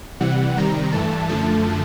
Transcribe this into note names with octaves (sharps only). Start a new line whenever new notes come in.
C3 E3 G3 F#5
C3 D#3 G3 A#5
G2 E3 A3 A5
F#2 D3 F3 A3 A5